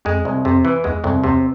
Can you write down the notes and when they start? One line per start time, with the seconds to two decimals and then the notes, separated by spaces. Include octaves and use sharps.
0.05 F2 G#3
0.25 C2
0.45 F2 C3
0.65 E3
0.84 E2 G#3
1.04 C2 F2
1.24 E2 C3